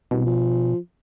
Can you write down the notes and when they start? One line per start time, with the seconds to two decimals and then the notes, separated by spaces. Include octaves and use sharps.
0.11 C2 B2
0.25 F3